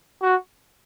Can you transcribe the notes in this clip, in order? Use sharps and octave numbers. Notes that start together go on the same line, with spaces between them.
F#4